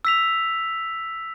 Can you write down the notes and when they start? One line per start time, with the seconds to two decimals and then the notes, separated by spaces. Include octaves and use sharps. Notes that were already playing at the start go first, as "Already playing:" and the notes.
0.05 E6 B6 F7